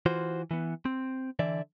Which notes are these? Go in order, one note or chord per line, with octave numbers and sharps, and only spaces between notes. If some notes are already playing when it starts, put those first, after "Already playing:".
E3 F4 F#4 C5
E3 B3
C4
D3 E3 D5 E5